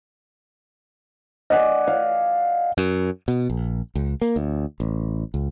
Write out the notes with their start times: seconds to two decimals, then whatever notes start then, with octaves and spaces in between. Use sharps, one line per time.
1.50 D5 D#5 F#5 G#5
1.87 F5
2.78 F#2
3.28 B2
3.50 A#1
3.95 C#2
4.22 A#3
4.36 D2
4.80 A1
5.34 C#2